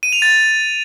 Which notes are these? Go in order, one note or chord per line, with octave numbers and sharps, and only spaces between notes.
D#7
F7
A6